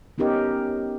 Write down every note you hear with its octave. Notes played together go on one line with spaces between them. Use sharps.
B3 C#4 D#4 G4 A#4 D#5